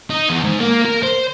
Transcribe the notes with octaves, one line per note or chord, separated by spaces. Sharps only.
D#4
E2
G#2
A#3
A#4
C5